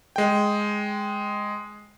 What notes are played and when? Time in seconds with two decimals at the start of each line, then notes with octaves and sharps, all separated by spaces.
0.16 G#3 G5